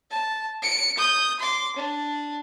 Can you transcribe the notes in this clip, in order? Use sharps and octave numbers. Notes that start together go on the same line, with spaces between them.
A5
C#7 D7
D#6 G6
C6 D6
D4